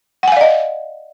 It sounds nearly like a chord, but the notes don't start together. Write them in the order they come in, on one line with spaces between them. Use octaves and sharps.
F#5 G#5 F5 D5 D#5